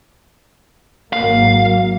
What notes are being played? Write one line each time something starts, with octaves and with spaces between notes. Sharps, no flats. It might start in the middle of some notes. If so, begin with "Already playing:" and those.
G#1 F#3 A#3 F5